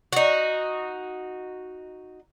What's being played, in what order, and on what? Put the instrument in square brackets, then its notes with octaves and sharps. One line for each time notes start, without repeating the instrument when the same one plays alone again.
[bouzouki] D#4 F#4